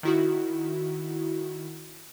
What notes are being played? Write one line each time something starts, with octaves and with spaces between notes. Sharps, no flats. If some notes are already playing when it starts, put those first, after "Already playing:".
D#3 E4 F#4